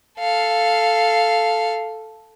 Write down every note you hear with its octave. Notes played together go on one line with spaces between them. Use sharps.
A4 F5